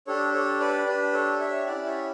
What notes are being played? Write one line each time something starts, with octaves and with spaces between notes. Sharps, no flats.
D4 G4 A4 C#5
A4 C#5
B4 D5
D4 G4 B4
A4 C#5
C#5 E5
C#4 E4 G4 D5 F#5
C#5 E5